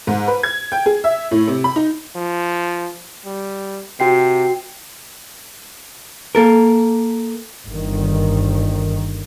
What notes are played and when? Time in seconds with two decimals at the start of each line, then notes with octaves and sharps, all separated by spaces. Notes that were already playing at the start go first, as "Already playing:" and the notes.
0.07 G#2
0.28 B4
0.43 G#6
0.72 G5
0.86 G#4
1.04 E5
1.31 A2
1.48 C3
1.64 B5
1.76 D#4
2.16 F3
3.26 G3
4.00 C3 F#4 G5 C7
6.35 A#3 A4 A#4
7.66 G1 D#3